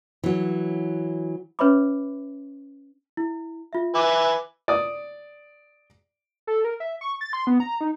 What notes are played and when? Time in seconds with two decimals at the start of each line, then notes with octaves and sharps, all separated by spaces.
0.23 E3 F#3
1.59 C#4 B4 C#5 E5 B5 D6
3.17 E4
3.73 F4 E5
3.95 B4 E5 G#5 D6
4.68 D5 D#6
6.47 A4
6.65 A#4
6.80 E5
7.01 C#6
7.21 A6
7.33 C6
7.47 B3
7.60 A#5
7.81 D#4